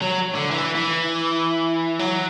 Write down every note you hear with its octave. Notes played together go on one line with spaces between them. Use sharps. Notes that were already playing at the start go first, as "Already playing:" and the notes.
F#3
D3
E3
E3
F#3